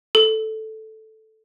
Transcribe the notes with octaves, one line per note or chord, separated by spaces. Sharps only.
A4